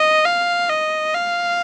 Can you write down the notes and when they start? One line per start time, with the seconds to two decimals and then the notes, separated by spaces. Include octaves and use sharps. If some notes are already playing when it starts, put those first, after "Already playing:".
Already playing: D#5
0.25 F5
0.70 D#5
1.15 F5